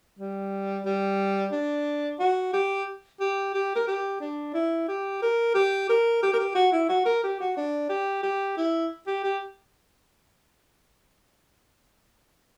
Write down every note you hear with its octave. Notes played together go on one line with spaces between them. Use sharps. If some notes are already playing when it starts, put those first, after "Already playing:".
G3
G3
D4
F#4
G4
G4
G4
A#4
G4
D4
E4
G4
A#4
G4
A#4
G4
A#4
G4
F#4
E4
F#4
A#4
G4
F#4
D4
G4
G4
E4
G4
G4